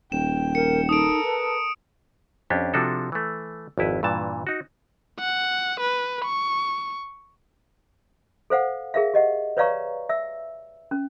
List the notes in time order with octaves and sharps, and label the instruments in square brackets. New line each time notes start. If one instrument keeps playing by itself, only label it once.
[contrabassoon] D#1 [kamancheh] G5 [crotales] E7
[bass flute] A#4 [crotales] C#7
[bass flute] D#4 [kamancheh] A4 A#4 [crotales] D#6 D7
[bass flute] B4
[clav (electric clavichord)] F2 C#4 D4 G4
C3 F3 D4 F#4 A4
E3 A3
G#1 F2 E4 B4
G2 A#2 E3 A5
D#4 F#4
[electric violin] F#5
B4
C#6
[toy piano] A4 C5 F5 F#5
G#4 A#4 E5 F5
G4 D#5 F#5
B4 C#5 D5 F5 A#5 C#6
E5 E6
C#4